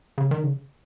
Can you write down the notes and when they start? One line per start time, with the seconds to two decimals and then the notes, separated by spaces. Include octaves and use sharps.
0.18 C#3
0.31 D#3
0.44 C#3